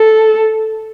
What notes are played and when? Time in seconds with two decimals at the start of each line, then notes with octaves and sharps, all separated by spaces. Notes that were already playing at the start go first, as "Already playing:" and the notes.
Already playing: A4